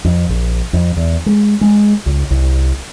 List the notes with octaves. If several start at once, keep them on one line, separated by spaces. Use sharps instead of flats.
F2
A#1
F2
E2
G#3
G#3
C#2
C2